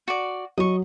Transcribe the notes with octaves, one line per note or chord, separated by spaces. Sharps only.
F#4 D5
F#3 D#5 C#6